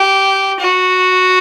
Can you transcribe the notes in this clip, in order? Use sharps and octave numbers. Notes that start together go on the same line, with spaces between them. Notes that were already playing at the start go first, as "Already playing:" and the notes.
Already playing: G4
F#4